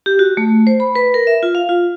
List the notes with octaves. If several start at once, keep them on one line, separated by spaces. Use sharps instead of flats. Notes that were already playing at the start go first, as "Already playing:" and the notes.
G4
F#4
A3
C5
B5
B4
A#4
E5
F4
F5
F4